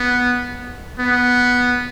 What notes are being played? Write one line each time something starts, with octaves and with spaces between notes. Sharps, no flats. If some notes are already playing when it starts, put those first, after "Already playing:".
Already playing: B3
B3